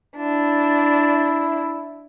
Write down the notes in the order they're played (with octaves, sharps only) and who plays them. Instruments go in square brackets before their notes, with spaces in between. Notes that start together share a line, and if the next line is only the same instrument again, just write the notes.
[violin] D4 [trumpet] E4